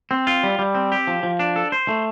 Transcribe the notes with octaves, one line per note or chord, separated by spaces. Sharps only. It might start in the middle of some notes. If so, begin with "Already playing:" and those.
C4
F4
G3
G3
C4
G4
F3
F3
D4
A4
C5
A3